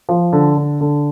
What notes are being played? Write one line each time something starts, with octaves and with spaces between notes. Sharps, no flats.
F3
D3
D3
D3